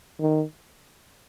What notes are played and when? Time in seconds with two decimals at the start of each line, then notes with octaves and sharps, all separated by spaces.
0.20 D#3